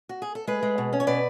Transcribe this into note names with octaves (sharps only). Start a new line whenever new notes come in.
F#4
G#4
A4
G#3 G#4 B4
G#3
B2
C#4
C#5
B2 B4 D5